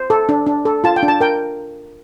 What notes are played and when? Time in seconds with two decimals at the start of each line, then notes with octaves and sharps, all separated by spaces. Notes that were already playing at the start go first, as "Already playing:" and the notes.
Already playing: C5
0.10 A4
0.29 D4
0.47 D4
0.65 A4
0.84 F4 A5
0.96 G5
1.03 D4
1.08 A5
1.20 A#4 G5